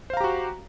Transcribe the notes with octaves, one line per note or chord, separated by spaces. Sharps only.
F#4 G4 C5 F5 A#5